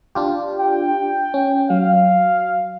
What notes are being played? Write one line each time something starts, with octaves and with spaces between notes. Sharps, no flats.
D4 F4 G4
G5
C#4
F#3 F5